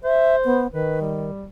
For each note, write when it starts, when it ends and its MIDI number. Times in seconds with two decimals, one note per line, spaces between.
0.04 0.64 72
0.04 0.36 76
0.45 0.67 59
0.73 1.30 51
0.73 0.99 71
1.01 1.47 55